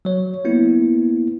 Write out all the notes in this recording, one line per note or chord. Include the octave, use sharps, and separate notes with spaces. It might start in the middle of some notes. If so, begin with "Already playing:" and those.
F#3 C#5
A#3 B3 E4